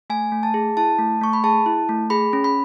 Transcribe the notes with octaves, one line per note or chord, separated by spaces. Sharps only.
A3 G#5
A3
A5
G#4
E4 A5
A3
A3 C#6
B5
G#4 A5
E4
A3
G#4 B5
C#4
B5